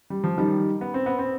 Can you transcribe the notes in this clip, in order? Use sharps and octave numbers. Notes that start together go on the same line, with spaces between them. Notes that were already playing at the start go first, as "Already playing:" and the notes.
G3
F3
D#3 G3
B3
C4
B3
C4